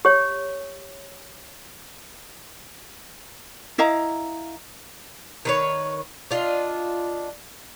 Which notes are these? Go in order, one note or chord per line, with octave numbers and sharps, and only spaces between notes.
G4 C#5
E4 D#5 F5 A#5
D#3 B4 C#5
D4 F4 D#5